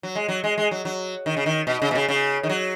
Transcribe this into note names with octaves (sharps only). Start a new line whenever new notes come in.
F#3
G#3
F#3
G#3
G#3
F#3
F#3
D#3
C#3
D#3
B2
C#3
B2
C#3
C#3
D#3
F#3